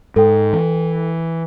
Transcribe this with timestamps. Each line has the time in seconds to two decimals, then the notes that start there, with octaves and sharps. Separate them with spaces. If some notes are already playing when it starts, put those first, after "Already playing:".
0.16 G#2 A4 G5
0.53 E3